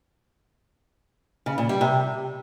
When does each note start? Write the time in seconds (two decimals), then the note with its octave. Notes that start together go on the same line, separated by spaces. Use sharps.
1.46 C#3
1.58 A#2
1.69 G3
1.81 C3